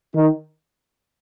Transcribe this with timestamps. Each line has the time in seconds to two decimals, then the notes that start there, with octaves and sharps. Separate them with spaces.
0.15 D#3 D#4